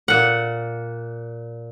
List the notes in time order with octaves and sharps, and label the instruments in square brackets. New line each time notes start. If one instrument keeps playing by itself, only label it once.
[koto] A#2 F#5